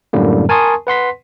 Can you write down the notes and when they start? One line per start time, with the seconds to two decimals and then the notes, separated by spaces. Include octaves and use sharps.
0.13 F#2 A2 D3 G3 A#3
0.49 A#4 G#5 A5 C6 C#6 D#6
0.87 B4 F#5 C6 B6